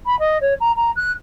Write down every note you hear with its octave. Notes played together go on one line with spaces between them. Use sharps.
B5
D#5
C#5
A#5
A#5
F#6